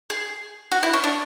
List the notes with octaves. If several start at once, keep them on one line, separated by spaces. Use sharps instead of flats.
G#4
F#4
E4
C#4
D4